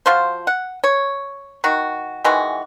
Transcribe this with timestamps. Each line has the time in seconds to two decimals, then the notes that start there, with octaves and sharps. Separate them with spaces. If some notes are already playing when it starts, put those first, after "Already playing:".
0.06 F3 F4 F#4 C5
0.47 F#5
0.84 C#5
1.64 D#3 F#4
2.24 D#3 E3 G#3 F#4